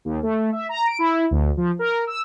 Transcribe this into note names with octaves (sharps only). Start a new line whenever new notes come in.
D#2
A3
E5
A#5
D7
E4
D2
F3
A#4
E6